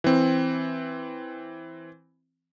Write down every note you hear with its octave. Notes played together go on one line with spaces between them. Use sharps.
E3 C4